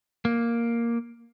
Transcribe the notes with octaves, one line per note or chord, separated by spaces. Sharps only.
A#3